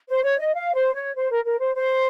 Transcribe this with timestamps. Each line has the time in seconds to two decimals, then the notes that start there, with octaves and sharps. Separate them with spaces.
0.09 C5
0.24 C#5
0.39 D#5
0.55 F5
0.75 C5
0.94 C#5
1.16 C5
1.31 A#4
1.45 A#4
1.60 C5
1.75 C5